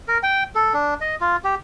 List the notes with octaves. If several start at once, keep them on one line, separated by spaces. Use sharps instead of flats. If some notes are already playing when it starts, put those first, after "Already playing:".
A#4
G5
A4
D4
D#5
F4
G4